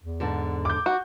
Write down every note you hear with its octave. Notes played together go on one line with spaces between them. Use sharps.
E2
G#2 D3
D6 G6
F#4